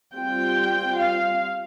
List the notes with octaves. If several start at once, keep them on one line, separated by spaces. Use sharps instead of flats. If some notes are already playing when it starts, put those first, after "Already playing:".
G3 C4 F4 G5
F5